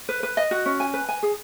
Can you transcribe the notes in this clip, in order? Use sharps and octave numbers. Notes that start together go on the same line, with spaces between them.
B4
B4
D#5
F#4
C#4
G#5
B4
G#5
G#4